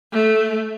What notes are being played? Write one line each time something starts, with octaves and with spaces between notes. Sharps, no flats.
A3